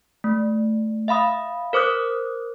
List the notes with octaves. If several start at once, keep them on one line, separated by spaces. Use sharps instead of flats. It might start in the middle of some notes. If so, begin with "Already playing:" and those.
A3
E5 F5 B5 D#6
A#4 C5 D6 D#6 F#6